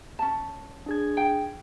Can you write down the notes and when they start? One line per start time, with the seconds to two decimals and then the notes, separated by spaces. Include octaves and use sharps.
0.19 C#4 A5
0.86 D4 G#4 G#6
1.17 G5